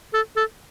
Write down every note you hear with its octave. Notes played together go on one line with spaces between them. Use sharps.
A4
A4